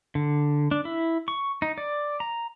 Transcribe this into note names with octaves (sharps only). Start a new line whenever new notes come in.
D3
D4
E4
C#6
D#4
D5
A#5